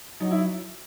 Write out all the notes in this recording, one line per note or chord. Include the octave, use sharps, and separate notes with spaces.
F#3 D#4
E4